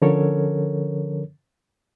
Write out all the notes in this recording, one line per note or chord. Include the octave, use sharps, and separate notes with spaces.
D3 F3 C#4 A4 A#4 C#5